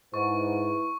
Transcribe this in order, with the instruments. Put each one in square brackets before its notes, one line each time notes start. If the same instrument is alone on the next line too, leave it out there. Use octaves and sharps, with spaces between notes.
[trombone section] G#2 [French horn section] E4 B4 [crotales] C#6